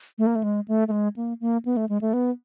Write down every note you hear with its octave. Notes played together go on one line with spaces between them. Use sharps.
A3
A#3
A3
G#3
A3
A3
G#3
A#3
A#3
B3
A3
G#3
A3
B3